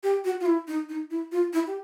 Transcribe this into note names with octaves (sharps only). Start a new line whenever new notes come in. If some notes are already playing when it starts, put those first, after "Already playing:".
G4
F#4
F4
E4
D#4
D#4
E4
F4
E4
G4